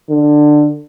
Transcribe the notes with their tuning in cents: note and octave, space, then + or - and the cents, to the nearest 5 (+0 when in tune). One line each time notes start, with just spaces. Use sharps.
D3 +15